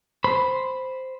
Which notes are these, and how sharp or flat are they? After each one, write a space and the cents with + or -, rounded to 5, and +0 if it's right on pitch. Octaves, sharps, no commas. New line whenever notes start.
C5 -5 B5 +0